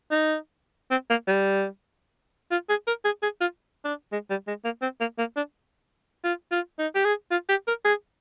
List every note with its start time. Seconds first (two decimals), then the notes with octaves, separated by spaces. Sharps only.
0.11 D#4
0.91 C4
1.10 A#3
1.28 G3
2.51 F4
2.69 G#4
2.87 A#4
3.05 G#4
3.23 G#4
3.41 F4
3.85 D4
4.12 G#3
4.30 G3
4.48 G#3
4.64 A#3
4.82 C4
5.00 A#3
5.18 A#3
5.36 D4
6.24 F4
6.52 F4
6.79 D#4
6.95 G4
7.05 G#4
7.31 F4
7.49 G4
7.67 A#4
7.85 G#4